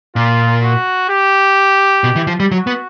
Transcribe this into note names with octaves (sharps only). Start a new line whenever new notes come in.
A#2 F4
F#4
G4
B2
E3
F3
G3
F#3 F#4
B3